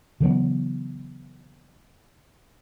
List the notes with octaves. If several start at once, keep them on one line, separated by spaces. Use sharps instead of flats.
C#3 E3 F#3 B3